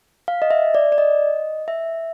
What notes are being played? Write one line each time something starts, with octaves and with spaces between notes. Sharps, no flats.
F5
D#5
E5
D5
D5
D#5
E5